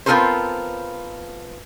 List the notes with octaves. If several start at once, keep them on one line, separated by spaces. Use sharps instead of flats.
B3 C4 F4 A4 A#4 C5